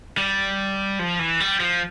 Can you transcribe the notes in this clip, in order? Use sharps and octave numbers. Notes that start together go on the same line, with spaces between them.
G3
F3
E3
G3
F3